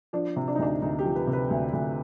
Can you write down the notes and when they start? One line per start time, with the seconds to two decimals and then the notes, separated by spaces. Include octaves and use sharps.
0.13 F3 D4
0.36 C3
0.48 D4
0.55 D#4
0.59 D2 D4
0.82 D2 D#4
0.99 G4
1.05 F3
1.16 B4
1.27 C3
1.33 B4
1.50 D2
1.73 D2